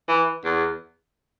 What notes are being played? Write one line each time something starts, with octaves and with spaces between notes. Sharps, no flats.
E3
E2